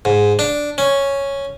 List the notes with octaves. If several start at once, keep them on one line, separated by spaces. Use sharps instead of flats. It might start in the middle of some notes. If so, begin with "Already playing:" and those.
G#2
D4
C#4